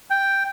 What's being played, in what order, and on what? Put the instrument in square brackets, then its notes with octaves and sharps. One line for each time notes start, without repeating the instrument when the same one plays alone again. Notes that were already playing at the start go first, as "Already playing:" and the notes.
[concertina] G5